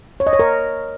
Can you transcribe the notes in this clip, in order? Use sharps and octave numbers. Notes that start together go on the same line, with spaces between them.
C#5
D#5
C#5
A#4